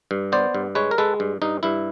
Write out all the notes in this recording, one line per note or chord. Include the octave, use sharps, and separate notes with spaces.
G2
B3 C5 D5
G2
G#3 B4 C#5
A#4
G#3 A4 B4
G2
G2 D#4
G2 E4